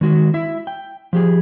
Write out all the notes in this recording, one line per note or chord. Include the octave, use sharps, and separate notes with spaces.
D#3 G#3 F#4
E4 E5
G5
F3 G4 G#4